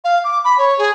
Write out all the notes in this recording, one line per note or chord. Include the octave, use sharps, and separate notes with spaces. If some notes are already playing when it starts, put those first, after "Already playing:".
F5
D6
B5
C#5
G#4